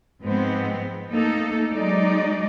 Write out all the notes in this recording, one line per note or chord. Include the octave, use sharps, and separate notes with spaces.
G#2 F3 G#3 B3 C4
A3 A#3 D#4 A4
F#3 G#3 D#4 D5